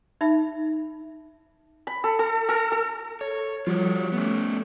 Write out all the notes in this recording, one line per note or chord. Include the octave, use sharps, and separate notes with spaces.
D#4 E5 B5
B5
A4
A4
A4
A4
A4 C#5
F3 G3 F4 F#4 C#5
A3 B3 C#4